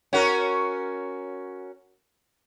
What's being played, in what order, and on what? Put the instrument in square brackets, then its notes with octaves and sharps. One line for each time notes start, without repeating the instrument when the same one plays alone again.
[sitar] C#4 F#4 A#4